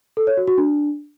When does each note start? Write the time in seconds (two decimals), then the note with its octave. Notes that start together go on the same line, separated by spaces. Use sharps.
0.17 A4
0.27 C#5
0.37 F#4
0.48 F#4
0.58 D4